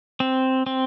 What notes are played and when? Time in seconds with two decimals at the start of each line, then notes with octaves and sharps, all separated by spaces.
0.20 C4
0.66 C4